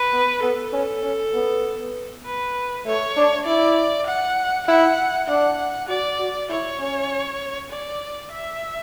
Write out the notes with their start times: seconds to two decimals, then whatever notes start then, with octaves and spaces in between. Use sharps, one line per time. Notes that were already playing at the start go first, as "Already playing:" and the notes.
Already playing: B4
0.13 B3
0.43 B3 A4
0.73 C#4
1.03 C#4
1.34 B3
2.25 B4
2.86 A3 C#5
3.16 D4
3.46 E4 D5
4.07 F#5
4.67 E4 F#5
5.28 D4 F#5
5.88 F#4 D5
6.19 F#4
6.49 E4 C#5
6.79 C#4
7.70 D5
8.31 E5